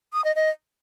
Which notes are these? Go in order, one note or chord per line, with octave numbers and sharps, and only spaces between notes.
D#6
D#5
D#5